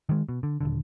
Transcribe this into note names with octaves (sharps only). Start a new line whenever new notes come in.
D#3 G#3
B2
D3
D#1 G#1 D3